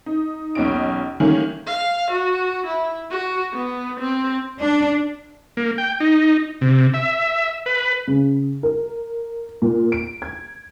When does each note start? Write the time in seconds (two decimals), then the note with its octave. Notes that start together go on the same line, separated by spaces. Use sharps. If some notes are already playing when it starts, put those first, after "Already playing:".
0.06 D#4
0.55 B1 E2 C#4 D#5 D7
1.20 D#3 E3 G3 A3 A#3 C#4
1.68 F5
2.11 F#4
2.67 E4
3.11 F#4
3.53 B3
4.00 C4
4.61 D4
5.57 A#3
5.78 G5
6.00 D#4
6.61 C3
6.94 E5
7.66 B4
8.07 C#3
8.63 A#4
9.62 A#2
9.92 D7
10.22 G#6